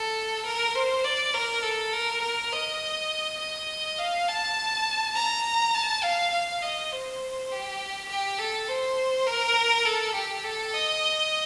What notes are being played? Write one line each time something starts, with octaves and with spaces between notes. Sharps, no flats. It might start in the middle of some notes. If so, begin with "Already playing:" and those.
Already playing: A4
A#4
C5
D5
A#4
A4
A#4
A#4
D#5
D#5
F5
A5
A#5
A5
F5
F5
D#5
C5
G4
G4
A4
C5
A#4
A4
G4
A4
D#5